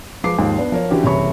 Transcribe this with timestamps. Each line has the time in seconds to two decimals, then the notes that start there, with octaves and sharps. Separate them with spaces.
0.24 F3 G#3 B4 D6 C7
0.38 D#2 G#2 F3
0.59 B3 D4
0.72 F3 A#4 C#5
0.90 D3 E3 C#4 F#4 G4
1.04 F#1 C2 E3 C#5 B5 C#6